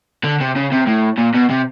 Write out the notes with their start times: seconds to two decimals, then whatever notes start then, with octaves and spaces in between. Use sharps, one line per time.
0.24 D3
0.40 C3
0.56 C#3
0.72 C3
0.87 A2
1.18 A#2
1.34 B2
1.50 C3